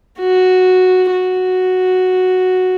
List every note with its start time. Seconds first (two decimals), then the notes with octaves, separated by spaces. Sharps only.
0.19 F#4
1.12 F#4